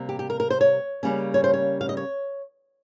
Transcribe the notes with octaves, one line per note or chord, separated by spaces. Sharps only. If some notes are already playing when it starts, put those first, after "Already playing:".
Already playing: C3 G3 A#3
G4
G4
A#4
A#4
C5
C#5
C#3 G3 A#3 C#4
C#5
C5
C#5
F5
D#5
C#5